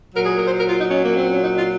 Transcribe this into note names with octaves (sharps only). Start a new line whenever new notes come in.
A#2 F#3 A#4
G#4
A#4
C5
A#4
F4
D#4
C#4
A#3
C4
C#4
D#4
F4